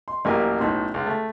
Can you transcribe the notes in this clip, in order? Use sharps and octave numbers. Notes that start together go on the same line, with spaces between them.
C6
A1 F#2 A#3 G4 G#5
B1 A2 C#4 C6
C#2
A3